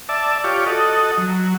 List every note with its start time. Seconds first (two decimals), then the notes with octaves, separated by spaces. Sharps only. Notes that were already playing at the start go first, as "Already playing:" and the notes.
0.09 D5 E5 A5
0.44 F4 G4 C#5 D5
0.66 F#4 A4 D#5
1.18 F#3